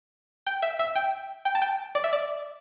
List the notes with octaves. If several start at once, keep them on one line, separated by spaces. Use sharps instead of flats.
G5
E5
E5
G5
G5
A5
G5
D5
E5
D5